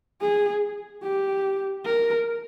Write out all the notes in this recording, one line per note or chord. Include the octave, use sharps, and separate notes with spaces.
G#4
G4
A#4